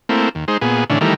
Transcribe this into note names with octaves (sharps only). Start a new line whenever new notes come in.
A3 A#3 C4 E4
D#2
G#3 D#4 C5
A#2 B3 G#4
A2 D3 E3 C#4 D4
D#3 E3 G3 A3 A#4